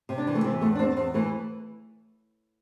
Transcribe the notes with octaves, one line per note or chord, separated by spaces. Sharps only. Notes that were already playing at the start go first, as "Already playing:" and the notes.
C3
D4
E3
A3
E3 C4
E2 A3
D4
E2 C4
E2 C4
E3 A3